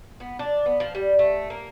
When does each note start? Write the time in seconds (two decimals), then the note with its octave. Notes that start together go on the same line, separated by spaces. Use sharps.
0.20 B3
0.39 D4
0.66 B3
0.80 F3
0.95 G3
1.19 A3
1.50 A#3